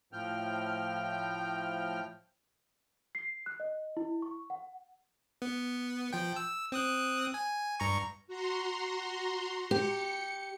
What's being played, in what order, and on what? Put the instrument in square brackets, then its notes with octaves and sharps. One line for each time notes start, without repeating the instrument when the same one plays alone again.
[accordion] A2 F3 G5 F6
[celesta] C7
F#6
D#5
E4
C#6
F#5
[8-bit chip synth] B3
F3 G5
E6
C4 D#6 F#6
G#5
G2 A#5 C#6
[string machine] F#4 A#5 C6
[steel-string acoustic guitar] G4 [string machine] C#7